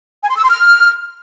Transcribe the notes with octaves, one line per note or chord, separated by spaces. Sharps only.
G#5
C6
E6
C6
F6